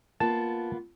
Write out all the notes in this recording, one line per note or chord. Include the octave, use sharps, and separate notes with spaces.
A#3 B3 F4 A5